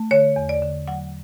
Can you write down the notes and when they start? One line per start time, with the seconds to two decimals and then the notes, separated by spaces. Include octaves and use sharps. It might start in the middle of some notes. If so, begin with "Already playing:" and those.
Already playing: A3
0.11 D3 C#5
0.36 E2
0.49 D5
0.62 D3
0.88 F#3 F#5